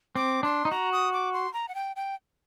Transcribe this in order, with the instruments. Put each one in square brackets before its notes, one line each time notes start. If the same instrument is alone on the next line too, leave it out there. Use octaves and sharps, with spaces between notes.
[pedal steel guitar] C4 [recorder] D6
[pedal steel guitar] D4 [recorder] C6
[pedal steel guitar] D#4
[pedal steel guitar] F#4 [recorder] A#5
[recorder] D#6
D6
C6
A#5
F#5
G5
G5